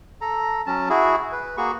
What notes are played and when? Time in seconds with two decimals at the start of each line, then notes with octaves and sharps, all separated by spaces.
0.21 A4 A#5
0.66 F#3 C#4 A5
0.89 E4 F#4 G#4
1.32 B4
1.57 A#3 F#4 G#4 C#6